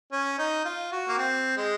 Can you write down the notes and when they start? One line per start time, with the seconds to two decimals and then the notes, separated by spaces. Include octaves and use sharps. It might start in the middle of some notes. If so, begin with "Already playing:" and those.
0.12 C#4
0.38 D#4
0.65 F4
0.92 F#4
1.08 A#3
1.18 C4
1.57 G#3